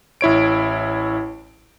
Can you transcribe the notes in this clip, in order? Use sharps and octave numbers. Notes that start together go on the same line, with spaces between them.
A1 E4 C#5 D7